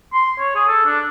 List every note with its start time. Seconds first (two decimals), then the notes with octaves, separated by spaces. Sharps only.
0.13 C6
0.39 C#5
0.55 G#4
0.68 A4
0.86 D4